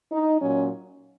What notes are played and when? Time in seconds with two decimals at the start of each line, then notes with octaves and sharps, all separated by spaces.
0.12 D#4
0.41 A#2 F#3 C#4